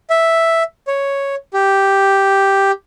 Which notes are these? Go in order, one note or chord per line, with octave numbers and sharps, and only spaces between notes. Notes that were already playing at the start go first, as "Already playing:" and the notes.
E5
C#5
G4